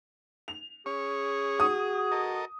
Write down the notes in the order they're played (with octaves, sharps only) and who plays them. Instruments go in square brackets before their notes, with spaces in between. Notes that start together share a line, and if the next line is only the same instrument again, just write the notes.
[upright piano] F7
[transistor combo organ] C#4 C#5 [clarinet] G#4
[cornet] F#4 [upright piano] D#6
[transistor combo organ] A4 A#4 D#5